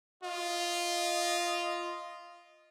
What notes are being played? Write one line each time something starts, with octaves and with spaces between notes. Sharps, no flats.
F4 D#5